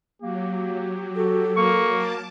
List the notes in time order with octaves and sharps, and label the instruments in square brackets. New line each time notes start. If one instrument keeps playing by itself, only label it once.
[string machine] F#3 [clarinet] A#3 [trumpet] G4
[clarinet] F#4 [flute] A4
[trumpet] A#3 [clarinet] C#6
[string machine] A5 D6